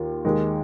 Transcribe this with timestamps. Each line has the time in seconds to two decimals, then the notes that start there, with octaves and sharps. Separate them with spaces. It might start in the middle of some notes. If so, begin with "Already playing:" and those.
Already playing: D#2 F4
0.25 D#2 D#3 G#3